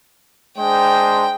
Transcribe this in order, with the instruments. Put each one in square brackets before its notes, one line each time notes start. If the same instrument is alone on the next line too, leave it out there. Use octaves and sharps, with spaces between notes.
[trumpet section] G#3 D4 C5 [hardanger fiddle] G5